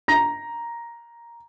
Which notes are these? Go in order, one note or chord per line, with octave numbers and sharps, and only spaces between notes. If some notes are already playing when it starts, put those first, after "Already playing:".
A#5 A#6